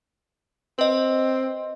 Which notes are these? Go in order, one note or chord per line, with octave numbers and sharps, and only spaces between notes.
C4 B4 D#5